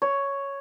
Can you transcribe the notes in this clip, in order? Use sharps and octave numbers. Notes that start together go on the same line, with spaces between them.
C#5